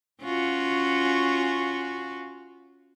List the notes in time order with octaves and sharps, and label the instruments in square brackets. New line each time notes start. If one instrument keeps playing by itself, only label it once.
[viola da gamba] C#4 F4 F#4